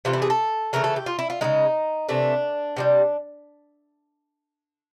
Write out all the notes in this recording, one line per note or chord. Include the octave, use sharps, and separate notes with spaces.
C3 E3 A3 F4
E4
G#4
A4
C#3 E3 A3 A#4
A4
G4
F4
E4
F4
C#3 F3 G#3 D#4
C3 E3 A3 D4
C3 D#3 G3